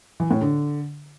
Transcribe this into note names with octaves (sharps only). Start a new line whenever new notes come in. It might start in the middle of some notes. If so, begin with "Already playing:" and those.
E3
A2
D3